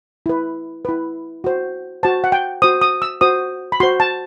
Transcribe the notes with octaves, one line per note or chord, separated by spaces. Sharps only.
E4 B4
E4 B4
F#4 C5
F#4 C5 A5
F#5
G5
F#4 C5 D#6
D#6
E6
F#4 C5 D#6
B5
F#4 C5 C6
A5